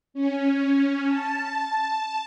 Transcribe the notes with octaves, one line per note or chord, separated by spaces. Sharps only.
C#4
A5